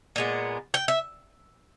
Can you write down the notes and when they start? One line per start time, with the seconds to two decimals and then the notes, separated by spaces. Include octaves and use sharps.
0.16 A#2 G#3 B3
0.74 G5
0.88 E5